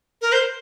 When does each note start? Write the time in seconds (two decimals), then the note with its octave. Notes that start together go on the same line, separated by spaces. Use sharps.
0.22 A#4
0.32 C5